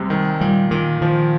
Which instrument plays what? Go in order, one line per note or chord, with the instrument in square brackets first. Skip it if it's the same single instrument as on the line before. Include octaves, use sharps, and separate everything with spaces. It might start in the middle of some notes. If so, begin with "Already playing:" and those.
Already playing: [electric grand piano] C2 C3 G#3 [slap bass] G3
[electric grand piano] D#3
[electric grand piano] A#2 [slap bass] G3
[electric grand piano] A#2 [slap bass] D#3
[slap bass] D#3 [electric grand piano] F3